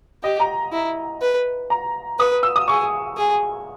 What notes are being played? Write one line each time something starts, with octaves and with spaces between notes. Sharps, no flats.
G4 D#5
A#5
E4
B4
A#5
B4 D#6
E6
D#6
G#4 C#6
G#4